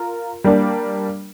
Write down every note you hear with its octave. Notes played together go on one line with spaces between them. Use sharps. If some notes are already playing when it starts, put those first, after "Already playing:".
Already playing: F4 A#4
G3 A#3 D4